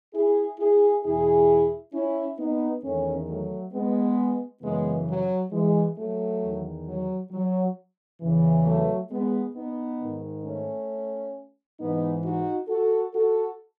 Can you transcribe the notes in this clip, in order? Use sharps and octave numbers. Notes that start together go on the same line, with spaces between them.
E4 G#4
E4 G#4
E2 B2 E4 G#4
C#4 E4
B3 D#4
E2 D#3 A3 C#4
F#3 A3
G#3 B3
F#2 C#3 E3 G#3 B3
F#3
E3 G#3
F#3 A3
E2 D#3
F#3
F#3
E2 C#3 E3
F#3 A3
G#3 B3
B3 D#4
G#2 D#3
A3 C#4
G#2 E3 B3 D#4
D#4 F#4
F#4 A4
F#4 A4